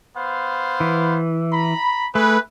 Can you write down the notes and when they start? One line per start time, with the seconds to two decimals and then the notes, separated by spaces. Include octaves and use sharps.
0.17 B3 C5 F5
0.80 E3
1.53 A#5 B5
2.15 A3 G#4 B4